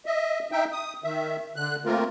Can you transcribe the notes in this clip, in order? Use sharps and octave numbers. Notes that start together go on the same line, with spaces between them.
D#5 E5
D#4 E5 G5
D#6
D#3 E5
D3 F#6
A3 A#3 C4 F4 A#4